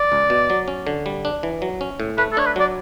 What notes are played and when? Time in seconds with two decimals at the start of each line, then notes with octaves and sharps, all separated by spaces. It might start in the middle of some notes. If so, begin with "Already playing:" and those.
Already playing: D5
0.12 C#2
0.30 B2
0.50 F#3
0.68 C#4
0.87 D3
1.06 G3
1.25 D4
1.43 E3
1.62 F#3
1.81 C#4
2.00 A2
2.18 A3 B4
2.32 A4
2.37 D4 C#5
2.46 B4
2.56 F#3 D5